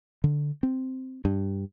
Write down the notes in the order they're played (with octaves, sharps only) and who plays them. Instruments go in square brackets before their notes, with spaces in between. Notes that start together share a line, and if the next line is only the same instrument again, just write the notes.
[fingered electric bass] D3
C4
G2